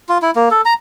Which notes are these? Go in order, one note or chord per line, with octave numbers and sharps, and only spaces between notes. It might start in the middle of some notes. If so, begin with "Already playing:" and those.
F4
E4
A#3
A4
A#5